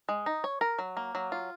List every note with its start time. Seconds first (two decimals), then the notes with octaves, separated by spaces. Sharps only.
0.09 G#3
0.26 D#4
0.44 C#5
0.61 A#4
0.79 F#3
0.97 A#3
1.15 F#3
1.32 F4